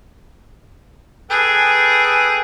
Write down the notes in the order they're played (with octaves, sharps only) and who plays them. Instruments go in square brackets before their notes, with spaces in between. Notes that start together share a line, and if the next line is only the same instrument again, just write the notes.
[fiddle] G#4 [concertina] A4 B4 G5